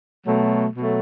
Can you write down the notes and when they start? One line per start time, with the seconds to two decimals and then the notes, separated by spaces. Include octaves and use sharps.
0.26 B2 F#3 A3
0.75 B2 F#3 A3